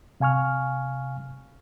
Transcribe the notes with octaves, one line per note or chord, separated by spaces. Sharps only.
C3 F5 G#5 C#6 F6